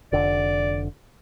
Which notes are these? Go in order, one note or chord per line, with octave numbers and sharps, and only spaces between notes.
F1 D3 D5